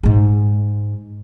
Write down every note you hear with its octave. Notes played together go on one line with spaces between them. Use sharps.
G#2 G#3